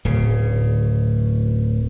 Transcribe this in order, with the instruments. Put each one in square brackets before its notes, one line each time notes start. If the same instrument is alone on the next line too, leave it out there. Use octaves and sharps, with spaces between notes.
[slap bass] D1 C#3